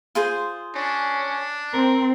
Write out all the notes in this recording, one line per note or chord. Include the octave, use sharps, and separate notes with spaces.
F4 G#4 C5
C#4 D4
C4 A#4